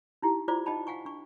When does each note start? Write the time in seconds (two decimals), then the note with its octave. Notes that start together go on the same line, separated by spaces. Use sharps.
0.22 D#4 E4 G4
0.48 E4 F4 C5 D5 D6
0.66 D#4 D#5 G5 A5 B5
0.87 F5 F#5 G#5 C#6
1.05 D4 C#6